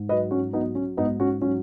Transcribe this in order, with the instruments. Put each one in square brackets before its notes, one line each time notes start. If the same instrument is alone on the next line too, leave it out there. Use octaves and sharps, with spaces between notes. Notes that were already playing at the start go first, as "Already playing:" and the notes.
Already playing: [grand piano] G#2
F#3 B4 D#5
C#4 F#4
F#3 B3 D#4
C#4
G#2 B3 D#4
C#4 F#4
F#3 C#4